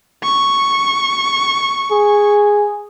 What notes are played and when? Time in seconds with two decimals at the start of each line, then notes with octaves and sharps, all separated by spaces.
0.24 C#6
1.91 G#4